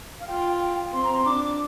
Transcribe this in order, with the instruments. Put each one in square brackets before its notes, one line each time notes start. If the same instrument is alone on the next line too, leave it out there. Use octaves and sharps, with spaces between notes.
[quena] F5
[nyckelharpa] F4 [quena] G5
[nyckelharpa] C4 [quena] C6
[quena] A#5
C6
[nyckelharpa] D4 [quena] D6